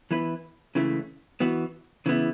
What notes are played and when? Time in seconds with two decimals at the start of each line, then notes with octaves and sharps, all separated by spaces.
0.11 E3 B3 E4 B4
0.75 C#2 C#3 E3 A3 E4
1.40 E3 B3 F#4
2.06 C#3 E3 B3 E4